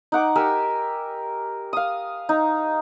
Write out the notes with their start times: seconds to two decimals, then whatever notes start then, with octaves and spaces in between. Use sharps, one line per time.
0.12 D#4 F#5 D6
0.35 G4 A#4 G#5 E6
1.73 F5 D#6
2.29 D#4